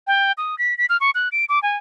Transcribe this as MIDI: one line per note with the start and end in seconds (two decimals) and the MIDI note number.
0.07 0.32 79
0.38 0.58 87
0.59 0.77 95
0.78 0.86 95
0.89 0.97 89
1.01 1.11 85
1.15 1.29 90
1.32 1.45 98
1.49 1.62 86
1.63 1.77 80